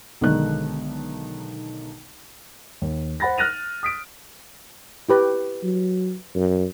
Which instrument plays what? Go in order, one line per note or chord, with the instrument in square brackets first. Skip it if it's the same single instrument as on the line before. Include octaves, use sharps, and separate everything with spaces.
[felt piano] B1 D3 D#3 G#3 D#4 F#6
[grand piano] D#2
C5 F#5 B5 A6 A#6
F6 F#6 A6 A#6 D#7 F7
D#6 B6 D7
[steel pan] E4 G4 B4
[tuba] F#3
F#2